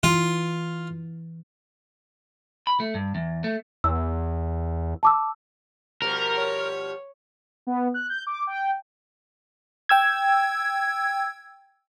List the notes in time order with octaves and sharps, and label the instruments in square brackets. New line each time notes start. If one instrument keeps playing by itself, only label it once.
[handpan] E3 [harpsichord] F4
[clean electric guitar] B5
A3
G2
E2
A3
[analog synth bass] E2 [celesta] E6
[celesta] A5 D6 E6
[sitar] B2 F3 G3 [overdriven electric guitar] A#4
[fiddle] C#5
[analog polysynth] B3
F#6
G6
D6
G5
[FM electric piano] G5 E6 G#6